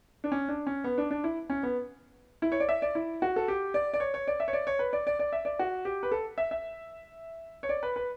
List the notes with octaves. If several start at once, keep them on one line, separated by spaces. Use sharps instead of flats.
D4
C#4
D4
C#4
B3
D4
D4
E4
C#4
B3
E4
C#5
D5
E5
D5
E4
F#4
A4
G4
D5
D5
C#5
C#5
D5
E5
C#5
D5
C#5
B4
D5
D5
D5
E5
D5
F#4
G4
B4
A4
E5
E5
C#5
D5
B4
B4